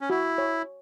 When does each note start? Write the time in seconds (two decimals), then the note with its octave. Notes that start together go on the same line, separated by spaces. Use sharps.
0.01 C#4
0.10 E4 F#4
0.38 C#5